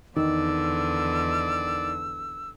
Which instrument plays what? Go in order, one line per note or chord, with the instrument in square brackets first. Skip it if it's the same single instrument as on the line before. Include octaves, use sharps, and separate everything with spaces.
[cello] E2 D3 [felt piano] D#3 [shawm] D5 [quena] E6